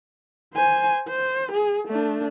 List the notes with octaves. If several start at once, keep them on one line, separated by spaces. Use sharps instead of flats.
C5 G#5
C5
G#4
A3 D4